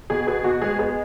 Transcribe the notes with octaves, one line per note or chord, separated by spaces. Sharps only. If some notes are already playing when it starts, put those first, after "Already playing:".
B2 G#4
B3 G#4
B2 F#4
G#3 G#4
B3 G#4